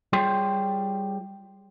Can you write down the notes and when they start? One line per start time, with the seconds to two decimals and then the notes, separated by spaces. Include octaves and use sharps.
0.13 G3 F4 G#4 C#5 G5 C6